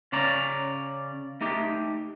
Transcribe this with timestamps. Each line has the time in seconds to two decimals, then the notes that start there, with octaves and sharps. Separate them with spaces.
0.12 C#3 C#4 D5 A#5
1.41 A3 D#4 G4